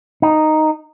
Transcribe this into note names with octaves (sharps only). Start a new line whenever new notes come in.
D#4